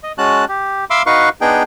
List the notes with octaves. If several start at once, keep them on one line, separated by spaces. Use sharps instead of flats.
D#5
G#3 C#4 F#4 A5 F#6
G4
E5 F5 B5 C6 D6 E6
D#4 F#4 B4 F5 C#6
B3 D4 D#4 G#4 G5